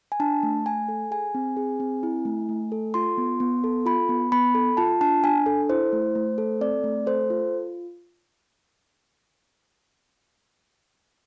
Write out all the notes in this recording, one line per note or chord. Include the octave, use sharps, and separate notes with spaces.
G#5
D4 A5
A3
A3 G#5
A4
G#4 G#5
C4
G#4
C4
E4
A3
A3
A4
F4 C6
B3
B3
A4
F4 B5
B3
B3 B5
A4
F4 A5
D4 A5
D4 G#5
A4
E4 C5
A3
A3
A4
C4 D5
A3
A4 C5
F4